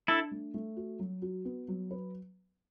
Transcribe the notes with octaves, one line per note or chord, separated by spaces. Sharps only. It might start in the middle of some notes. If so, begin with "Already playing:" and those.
D4 E4 A4
A3
A3
F#4
F#3
F#4
B3
F#3
B4